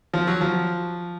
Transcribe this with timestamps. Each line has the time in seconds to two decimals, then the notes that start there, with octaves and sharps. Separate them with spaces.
0.13 F3
0.27 F#3
0.41 F3